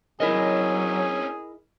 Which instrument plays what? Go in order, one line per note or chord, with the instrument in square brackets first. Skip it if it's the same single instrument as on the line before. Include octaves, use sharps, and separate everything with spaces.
[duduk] F#3 [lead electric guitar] C4 C#4 [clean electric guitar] E4 A#4 D#5 [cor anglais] G#4